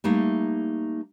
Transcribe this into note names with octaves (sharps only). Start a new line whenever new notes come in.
G3 A3 A#3 D#4